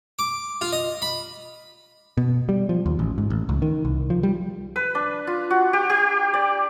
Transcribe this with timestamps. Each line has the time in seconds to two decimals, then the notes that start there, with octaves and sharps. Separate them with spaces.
0.19 D6
0.61 F4
0.73 D#5
1.02 B5
2.17 B2
2.49 G3
2.69 F3
2.86 D#2
2.99 A1
3.18 G#2
3.30 A1
3.49 C#2
3.62 D#3
3.85 C2
4.10 F3
4.23 G3
4.76 B4
4.95 D4
5.27 F4
5.50 F#4
5.73 G4
5.90 G4
6.34 D5